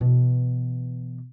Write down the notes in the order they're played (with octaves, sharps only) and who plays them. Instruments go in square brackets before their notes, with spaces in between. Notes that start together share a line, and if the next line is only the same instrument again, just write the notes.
[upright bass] B2 E3